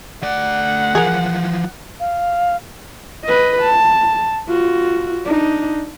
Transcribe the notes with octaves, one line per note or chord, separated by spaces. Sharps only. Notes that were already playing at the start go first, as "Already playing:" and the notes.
A3 D5 F#5
E3 F3 G#4 A#4
F5
B4 D#5
A5
F4 F#4
D4 D#4